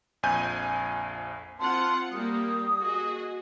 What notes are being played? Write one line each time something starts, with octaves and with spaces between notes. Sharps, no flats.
A#1 F2 G#5 G6 D#7
C4 F4 F#5 A5 C6
G3 A#3 D#6
F#4 G#4 D#5